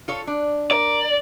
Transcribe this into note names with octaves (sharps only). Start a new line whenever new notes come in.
F4 A4 C#5
D4
A#4 D5